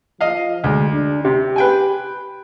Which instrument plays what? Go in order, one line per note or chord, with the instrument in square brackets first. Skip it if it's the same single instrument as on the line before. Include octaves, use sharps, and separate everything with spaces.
[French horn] F3 [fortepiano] D#5 F5
[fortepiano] D2 [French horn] G#3
[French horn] D4
[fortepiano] C3 [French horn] G4
[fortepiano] B4 G5 G#5